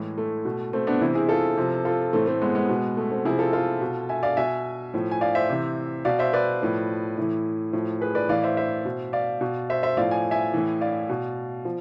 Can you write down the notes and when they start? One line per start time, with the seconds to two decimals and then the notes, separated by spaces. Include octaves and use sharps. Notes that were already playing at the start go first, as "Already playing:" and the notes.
Already playing: A2 E3 G#3
0.18 A3
0.45 B2
0.73 A3 C4
0.87 B3 D4
1.01 C3 E3 C4 E4
1.15 E4 G#4
1.29 F4 A4
1.57 C3 F3
1.85 F4 A4
2.13 A2 E3 A3 C4
2.27 A3 C4
2.41 G#3 B3
2.55 G#3 B3
2.69 B2
2.97 A3
3.11 A3 C4
3.25 C3 F3 E4 G#4
3.39 F4 A4
3.53 F4 A4
3.81 B2
4.09 E5 G#5
4.23 D5 F5
4.37 B2 E5 G#5
4.94 A2 F3
5.11 G#5
5.21 D5 F5
5.35 C5 E5
5.50 C3 E3
6.05 B2 D5 F5
6.19 C5 E5
6.33 B4 D5
6.62 A2 F3
7.18 A2 E3
7.73 A2 F3
8.01 G#4 B4
8.15 B4 D5
8.29 A2 E3 D5 F5
8.43 C5 E5
8.57 C5 E5
8.85 B2
9.13 D5 F5
9.41 B2
9.70 C5 E5
9.83 C5 E5
9.97 A2 F3 D5 F5
10.11 G#5
10.31 E5 G#5
10.53 A2 E3
10.81 D5 F5
11.09 B2
11.65 F3